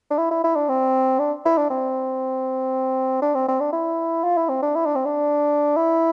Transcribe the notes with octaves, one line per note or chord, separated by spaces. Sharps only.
D4
E4
E4
E4
D4
C4
D4
E4
D4
C4
D4
C4
C4
D4
E4
F4
E4
C4
D4
E4
D4
C4
D4
E4